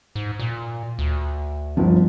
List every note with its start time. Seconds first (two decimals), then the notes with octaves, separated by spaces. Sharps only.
0.16 G#2
0.40 A#2
0.99 D2
1.77 G1 F3